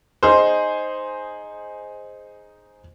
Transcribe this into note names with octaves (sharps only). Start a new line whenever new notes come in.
D#4 G#4 C5